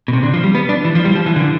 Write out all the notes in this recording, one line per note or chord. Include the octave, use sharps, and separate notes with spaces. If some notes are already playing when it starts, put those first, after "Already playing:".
B2
C3
D3
F3
G3
B3
D4
E3
F3
G3
F3
E3
D3